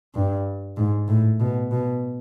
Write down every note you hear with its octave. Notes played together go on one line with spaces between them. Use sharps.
G2
G#2
A2
B2
B2